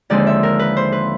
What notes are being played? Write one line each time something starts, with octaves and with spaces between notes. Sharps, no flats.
D#2 D3 F3 G#3 C4 D5
E5
A#4
B4
C5
B4